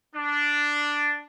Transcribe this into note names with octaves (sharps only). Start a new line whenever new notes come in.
D4